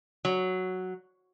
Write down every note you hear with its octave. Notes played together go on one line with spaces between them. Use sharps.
F#3